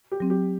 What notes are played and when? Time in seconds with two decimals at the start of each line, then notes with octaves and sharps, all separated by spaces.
0.12 G4
0.20 F#3 C4
0.30 G4